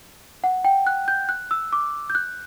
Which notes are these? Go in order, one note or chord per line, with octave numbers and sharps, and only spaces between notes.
F#5
G5
F#6
G6
F#6
E6
D6
G6
F#6